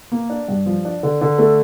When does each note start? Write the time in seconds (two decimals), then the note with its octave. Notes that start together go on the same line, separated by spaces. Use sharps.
0.12 A#3
0.30 D4
0.48 G2
0.66 F3
0.85 D4
1.03 D3
1.21 D3
1.39 A3